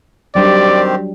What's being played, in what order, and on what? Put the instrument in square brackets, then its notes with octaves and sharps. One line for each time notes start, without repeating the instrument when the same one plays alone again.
[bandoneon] D#3 C4 G4 [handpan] F#3 G3 D4 [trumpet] D5